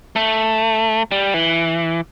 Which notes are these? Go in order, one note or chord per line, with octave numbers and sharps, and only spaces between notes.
A3
G3
E3